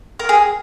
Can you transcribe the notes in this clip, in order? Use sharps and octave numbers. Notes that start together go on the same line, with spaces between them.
A#4
G#4